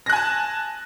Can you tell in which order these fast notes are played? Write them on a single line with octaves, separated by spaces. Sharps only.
A#6 F#6 G#5 A5